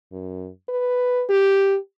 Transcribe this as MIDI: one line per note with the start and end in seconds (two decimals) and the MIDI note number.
0.12 0.48 42
0.69 1.24 71
1.29 1.77 67